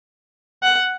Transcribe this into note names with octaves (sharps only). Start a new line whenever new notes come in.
F#5